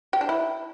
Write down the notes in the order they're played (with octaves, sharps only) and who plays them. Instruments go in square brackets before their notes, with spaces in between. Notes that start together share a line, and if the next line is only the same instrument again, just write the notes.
[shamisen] G4
D4
E4